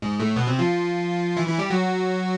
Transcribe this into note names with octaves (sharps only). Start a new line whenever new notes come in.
G#2 G#3
A2 A3
B2 B3
C3 C4
F3 F4
E3 E4
E3 E4
G3 G4
F#3 F#4